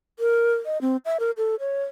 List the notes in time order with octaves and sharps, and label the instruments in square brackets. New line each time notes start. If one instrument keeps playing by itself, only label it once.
[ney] A#4
D#5
C4
E5
A#4
A4
C#5